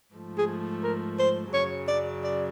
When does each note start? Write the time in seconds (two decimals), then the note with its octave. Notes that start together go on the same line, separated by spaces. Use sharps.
0.14 G#2 F3 A3
0.38 G#4
0.83 A#4
1.19 C5
1.53 F#2 C#3 F#3 C#5
1.88 D5
2.24 D5